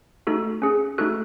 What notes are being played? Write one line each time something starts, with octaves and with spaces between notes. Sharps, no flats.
A3 D#4 F#4 A4
C#4 G#4
A3 D#4 F#4 A4 F#6